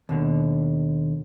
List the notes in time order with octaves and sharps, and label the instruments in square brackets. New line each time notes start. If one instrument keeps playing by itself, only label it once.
[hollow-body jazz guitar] D#2 B2 D3